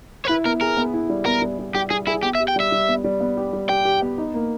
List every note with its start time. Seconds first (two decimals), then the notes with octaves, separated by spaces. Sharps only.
0.25 C#5
0.28 E4 B4
0.45 B3 A#4
0.61 G#4 A#4
0.77 B3
0.94 E4
1.10 G3
1.26 B3 A#4
1.42 G3
1.59 G3
1.75 G3 G4
1.90 G3 G#4
2.07 E4 G#4
2.23 B3 G4
2.35 E5
2.40 G4
2.48 G5
2.56 G3 E5
2.72 G3
2.88 B3
3.04 G3
3.20 B3
3.37 G4
3.53 G3
3.69 G4 G5
3.85 G4
4.02 B3
4.18 D#4
4.34 A#3